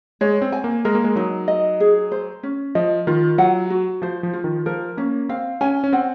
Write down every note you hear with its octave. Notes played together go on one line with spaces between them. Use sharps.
G#3 C#5
C4
G#5
A#3
G#3 A#4
A#3
G#3
F#3 D#4
D#5
G#4
C5
C#4
F3 D#5
D#3 F4
F#3 F#5
F#4
F3 C5
F3
F4
D#3
F3 A#4
A#3 C#4
C4 F5
C#4 G#5
C#4
C4 F#5